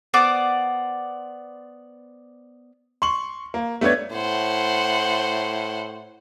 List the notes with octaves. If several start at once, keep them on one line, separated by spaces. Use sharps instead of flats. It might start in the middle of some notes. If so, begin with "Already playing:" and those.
B3 C5 D5 D6
C6 C#6 F#7
A#3
A3 B3 D4 C#5 G#6
A2 C5 F#5